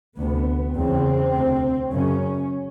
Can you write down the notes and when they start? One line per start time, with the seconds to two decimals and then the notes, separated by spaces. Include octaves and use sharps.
0.17 D2 C3 B3
0.75 E2 C#3 C4
1.34 D2 C3
1.92 F#2 C#3 C#4